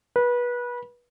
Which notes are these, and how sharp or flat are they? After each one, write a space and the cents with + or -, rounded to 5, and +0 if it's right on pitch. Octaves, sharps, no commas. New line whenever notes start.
B4 -25